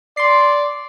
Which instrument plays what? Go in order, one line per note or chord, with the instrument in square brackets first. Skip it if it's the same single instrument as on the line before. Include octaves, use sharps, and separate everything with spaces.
[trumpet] D5 [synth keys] C6 C7